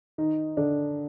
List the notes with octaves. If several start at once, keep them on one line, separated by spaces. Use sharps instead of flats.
D#3 D#4
D3 D4